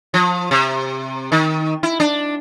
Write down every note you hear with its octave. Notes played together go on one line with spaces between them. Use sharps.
F3
C3
D#3
E4
D4